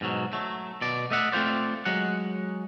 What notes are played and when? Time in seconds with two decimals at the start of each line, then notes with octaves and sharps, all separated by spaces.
0.01 G#2 B2 D3 F#3
0.33 F#3 A3
0.82 B2 D5
1.11 A3 D#5 E5 F#5
1.32 A3 C4 F4 C5 D5
1.85 F#3 G#3 F#5